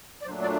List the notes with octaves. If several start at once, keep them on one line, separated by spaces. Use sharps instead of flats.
D5
A#2 F#3 A3 D4 C5
D5